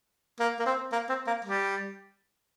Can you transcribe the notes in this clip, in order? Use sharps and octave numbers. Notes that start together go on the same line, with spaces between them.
A#3
A#3
C4
A#3
C4
A#3
G3